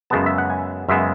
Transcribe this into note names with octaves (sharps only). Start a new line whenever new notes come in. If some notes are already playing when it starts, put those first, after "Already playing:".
F#2 C#3 G#3 B3 A5
E5
F#5
G#5
F#2 C#3 G#3 B3 E5